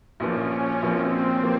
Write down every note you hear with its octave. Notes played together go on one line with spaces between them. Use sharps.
A#1 A#2 F3 A#3 C#4
C#4
A#1 A#2 F3 A#3 C4
F3 A#3